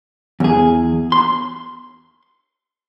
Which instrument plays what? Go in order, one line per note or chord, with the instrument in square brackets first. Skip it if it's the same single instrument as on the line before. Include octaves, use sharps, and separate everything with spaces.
[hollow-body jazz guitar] E2 G#4
C6